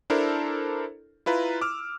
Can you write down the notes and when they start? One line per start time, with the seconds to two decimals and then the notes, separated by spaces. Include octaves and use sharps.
0.10 D4 E4 A4 A#4 C5
1.26 E4 F4 B4 A#5
1.61 D6 E6 F6